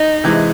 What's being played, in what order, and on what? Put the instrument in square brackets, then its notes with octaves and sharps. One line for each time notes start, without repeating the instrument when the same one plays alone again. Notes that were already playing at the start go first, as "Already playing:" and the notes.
Already playing: [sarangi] D#4
[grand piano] C3 E3 G#3